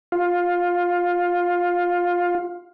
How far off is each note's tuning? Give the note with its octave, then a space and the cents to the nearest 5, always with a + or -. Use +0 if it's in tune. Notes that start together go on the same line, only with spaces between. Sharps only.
F4 +15